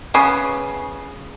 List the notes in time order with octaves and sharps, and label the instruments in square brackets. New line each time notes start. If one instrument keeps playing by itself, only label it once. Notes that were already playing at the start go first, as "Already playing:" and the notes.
[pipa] C#3 B3